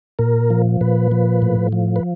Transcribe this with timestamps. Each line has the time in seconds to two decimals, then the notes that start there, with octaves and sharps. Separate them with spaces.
0.19 A#2 A#4
0.50 F3
0.81 A#2 B4
1.12 F3
1.42 A2
1.72 F3
1.96 B4